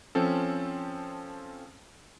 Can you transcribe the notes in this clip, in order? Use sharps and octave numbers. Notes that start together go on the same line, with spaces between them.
F3 C4 C#4 A4